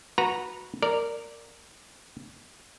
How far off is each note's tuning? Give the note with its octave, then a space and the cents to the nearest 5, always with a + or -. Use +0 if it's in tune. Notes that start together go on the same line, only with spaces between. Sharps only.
F#4 -15 B4 -15 A#5 +0
A#4 -10 D5 -5